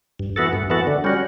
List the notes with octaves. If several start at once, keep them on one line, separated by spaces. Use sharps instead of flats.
G2
E3 B3 F#4 A4
G2
E3 B3 F#4 A4
D3
G3 C#4 F#4